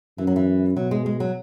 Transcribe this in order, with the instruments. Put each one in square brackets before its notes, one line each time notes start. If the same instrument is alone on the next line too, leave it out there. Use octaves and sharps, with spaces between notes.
[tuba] F#2 [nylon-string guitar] E3
[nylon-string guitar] F#3
E3
[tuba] B2 [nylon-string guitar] F#3
[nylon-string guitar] G#3
G#3
F#3